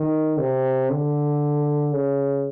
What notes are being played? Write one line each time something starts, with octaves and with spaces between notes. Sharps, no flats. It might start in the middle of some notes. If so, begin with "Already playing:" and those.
Already playing: D#3
C3
D3
C#3